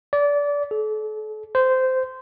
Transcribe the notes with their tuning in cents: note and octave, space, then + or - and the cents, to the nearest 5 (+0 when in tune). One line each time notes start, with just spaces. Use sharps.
D5 -25
A4 -40
C5 -15